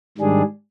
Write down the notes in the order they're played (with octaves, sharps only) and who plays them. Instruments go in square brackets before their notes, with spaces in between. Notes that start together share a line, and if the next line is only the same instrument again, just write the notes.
[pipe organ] G#2 D#3 G3 D4 G#4